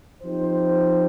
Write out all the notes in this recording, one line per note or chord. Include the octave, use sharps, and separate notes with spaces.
F3 C4 D#4 G4 C5